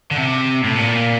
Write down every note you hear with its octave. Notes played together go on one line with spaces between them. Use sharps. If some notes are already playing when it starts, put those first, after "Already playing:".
D3
C3
A2
A#2